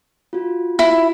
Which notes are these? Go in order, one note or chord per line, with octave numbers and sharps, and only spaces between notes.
F4 F#4
E4